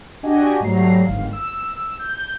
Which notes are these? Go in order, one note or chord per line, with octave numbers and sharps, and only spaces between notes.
D4 F#4 G4 D#5 G#5
G#2 F#3 G3 A3 A#5 C7
G1 G#2 D#3 F5
E6
G6